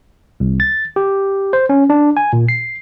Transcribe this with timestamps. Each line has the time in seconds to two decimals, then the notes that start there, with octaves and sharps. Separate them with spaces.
0.40 C2
0.60 A6
0.96 G4
1.53 C5
1.69 C#4
1.90 D4
2.17 G#5
2.33 A#2
2.49 C7